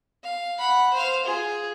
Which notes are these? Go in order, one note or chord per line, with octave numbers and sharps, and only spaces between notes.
F5
F#5 B5
C5 F5
F4 G#4